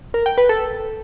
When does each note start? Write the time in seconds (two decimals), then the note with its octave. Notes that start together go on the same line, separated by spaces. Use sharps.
0.14 A#4
0.26 G5
0.38 B4
0.49 A4